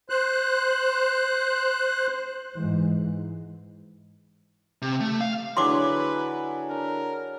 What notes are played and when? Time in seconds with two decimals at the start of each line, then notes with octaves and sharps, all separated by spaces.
0.10 C5 F#6
2.55 G#2 E3 G#3
4.82 C3
5.00 A3
5.20 F5
5.57 D3 F#3 E4 G#4 B4 C6 D6
6.70 D4 A#4